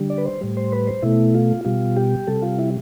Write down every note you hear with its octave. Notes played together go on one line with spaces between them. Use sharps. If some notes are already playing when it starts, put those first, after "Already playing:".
Already playing: D3 G3
D5
B4
C5
A2 G3
C5
B4
C5
B2 A3 E4
F4
B2 G3 F4
G4
C3 G3 A4
F4
E4